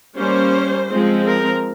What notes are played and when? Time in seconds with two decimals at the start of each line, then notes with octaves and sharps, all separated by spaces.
0.16 G3 A#3 C#4 C5
0.89 F3 G#3 C4
1.25 A#4